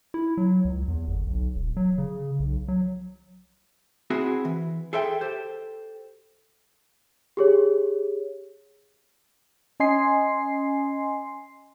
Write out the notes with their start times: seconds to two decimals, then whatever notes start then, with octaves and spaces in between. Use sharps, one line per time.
0.14 E4
0.37 F#3
0.65 C#2
0.88 E2
1.08 G1
1.27 B1
1.56 D#1
1.77 F#3
1.98 C#3
2.40 B1
2.68 F#3
4.10 C4 E4 F#4 G#4
4.45 E3
4.93 G#4 A4 C5 E5 G5
5.21 G4 A4 C5
7.37 G4 G#4 C#5
9.80 C#4 D#5 G#5 C6 C7